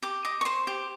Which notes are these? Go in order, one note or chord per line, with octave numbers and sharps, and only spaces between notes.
G4 D6
D#5 D6
C#6
C5 C6
G4